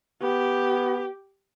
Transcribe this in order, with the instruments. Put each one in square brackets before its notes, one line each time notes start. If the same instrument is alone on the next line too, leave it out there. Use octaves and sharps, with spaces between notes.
[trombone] B3 [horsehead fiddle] G4